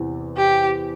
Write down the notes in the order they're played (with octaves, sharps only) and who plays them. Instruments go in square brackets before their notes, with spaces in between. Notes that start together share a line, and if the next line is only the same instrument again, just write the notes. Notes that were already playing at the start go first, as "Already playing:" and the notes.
Already playing: [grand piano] E2 C3 E3
[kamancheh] G4